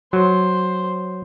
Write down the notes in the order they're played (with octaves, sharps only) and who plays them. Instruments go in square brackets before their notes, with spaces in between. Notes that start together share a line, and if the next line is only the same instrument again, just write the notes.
[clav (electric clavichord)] F#3 [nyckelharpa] C5